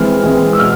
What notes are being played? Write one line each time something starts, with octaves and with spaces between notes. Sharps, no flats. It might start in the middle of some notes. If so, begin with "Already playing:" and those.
Already playing: E3 G#3 C4 F6
E3 G#3 C4
E6
B2 F6